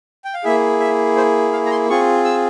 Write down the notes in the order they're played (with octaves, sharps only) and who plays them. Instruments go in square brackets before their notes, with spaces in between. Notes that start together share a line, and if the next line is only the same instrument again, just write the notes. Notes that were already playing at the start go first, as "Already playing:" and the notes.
[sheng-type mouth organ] G5
F5
A#3 E4 G#4 E5
E5
C5
F5
A#5
C6
C4 F4 G#4 C#6
E6